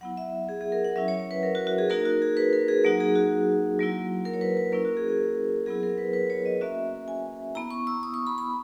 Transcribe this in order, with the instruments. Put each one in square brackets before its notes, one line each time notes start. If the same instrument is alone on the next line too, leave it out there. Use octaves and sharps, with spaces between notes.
[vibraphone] F#3 B3 E4 F#5
E5
G#4
G#4
A#4
F#5
F#3 C#4 E4 E5
C#5
C#5
B4
A#4
F#4
F#4
G#4
A#3 D#4 F#4 A#4
F#4
G#4
B4
A#4
G#4
F#3 A#3 D#4 F#4 G#4
G#4
F#4
F#3 A#3 E4
A#4
C#5
B4
B4
A#3 C#4 E4 A#4
F#4
G#4
G#4
F#3 B3 E4 G#4
A#4
B4
B4
C#5
D#5
A#3 C#4 F#4 E5
G#5
B3 E4 A#5
C#6
E6
D#6
C#6
B5
B5